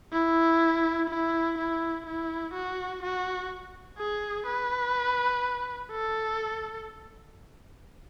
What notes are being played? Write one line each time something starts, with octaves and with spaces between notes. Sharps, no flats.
E4
E4
E4
E4
F#4
F#4
G#4
B4
A4